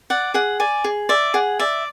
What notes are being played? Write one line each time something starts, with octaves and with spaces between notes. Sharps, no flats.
D5 F#5
G#4 F#5
D5 G#5
G#4
D5 E5
G#4 F#5
D5 E5